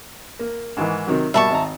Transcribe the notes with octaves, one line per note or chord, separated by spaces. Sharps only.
A#3
G#2 D#3 E3
C3 D#3 F#3
B2 G3 A#3 E5 A5 C#6
G#1 A#5